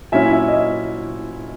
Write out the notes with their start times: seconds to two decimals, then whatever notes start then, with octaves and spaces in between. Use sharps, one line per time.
0.12 A#2 F#3 C#4 E4 E5 G#5
0.33 E5
0.48 D#5
0.54 E5